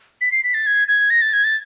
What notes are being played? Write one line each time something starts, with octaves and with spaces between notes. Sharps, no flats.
B6
C7
B6
A6
G#6
G#6
A#6
A6
G#6
A6